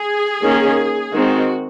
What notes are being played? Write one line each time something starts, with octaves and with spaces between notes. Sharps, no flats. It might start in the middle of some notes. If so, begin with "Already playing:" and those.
Already playing: G#4
D#3 A#3 C#4
D#3 G#3 C4 F#4